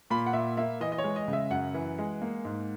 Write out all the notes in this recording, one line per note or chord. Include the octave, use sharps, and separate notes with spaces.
A#2 B5
F#5
A#2 E5
A#3 E5
E3 D#5
D#5
C#5
G#3
D#5
C#3
E5
F#2 F#5
E3
G#3
A#3
G#2